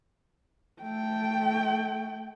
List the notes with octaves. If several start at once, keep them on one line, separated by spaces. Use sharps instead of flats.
A3 G5